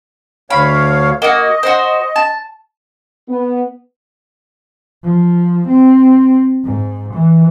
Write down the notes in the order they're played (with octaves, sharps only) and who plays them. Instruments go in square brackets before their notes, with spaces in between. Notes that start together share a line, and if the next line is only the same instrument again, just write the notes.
[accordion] D2 C#5 F5 [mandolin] B5
[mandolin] A#3 F#4 [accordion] D#5
[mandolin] F#4 C5
A5
[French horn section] B3
[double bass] F3
C4
G#2
E3